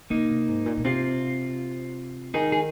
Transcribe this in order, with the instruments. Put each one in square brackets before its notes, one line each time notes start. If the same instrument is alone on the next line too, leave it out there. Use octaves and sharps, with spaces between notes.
[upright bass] C3 [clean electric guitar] A#3 D#4
[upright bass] C3
G#2
A#2
A#2
[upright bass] C3 [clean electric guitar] C4 F4
[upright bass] D#3 [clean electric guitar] D#4 G#4
[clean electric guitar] G#4